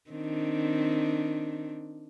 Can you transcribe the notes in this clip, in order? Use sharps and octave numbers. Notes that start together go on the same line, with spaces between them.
D#3 C4 D4